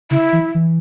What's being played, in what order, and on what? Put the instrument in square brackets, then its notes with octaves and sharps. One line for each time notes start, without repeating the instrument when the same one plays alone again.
[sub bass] C#3 [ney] E4
[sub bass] E3
E3